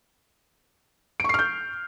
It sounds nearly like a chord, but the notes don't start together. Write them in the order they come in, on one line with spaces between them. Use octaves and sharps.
D7 C#6 C7 F6 G6